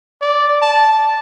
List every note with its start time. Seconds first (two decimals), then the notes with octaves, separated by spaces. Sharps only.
0.22 D5
0.62 A5